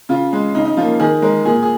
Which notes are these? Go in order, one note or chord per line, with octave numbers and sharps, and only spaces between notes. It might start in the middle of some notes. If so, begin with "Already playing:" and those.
C#3 F4
G#3
C#3 D#4
D#4
F3 A#3 F4
D#3 G#4
G#3 A#4
A#2 G#4
G#4